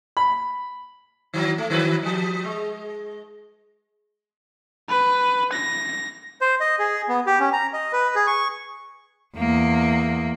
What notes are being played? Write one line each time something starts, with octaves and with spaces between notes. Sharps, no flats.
B5
D#3 F#3
A3
D#3 F#3 B4
F3 G3
G#3
B4
A#6
C5
D#5
G#4
B3
G4
C#4
A#5
D#5
B4
G#4
C#6
E2 A#3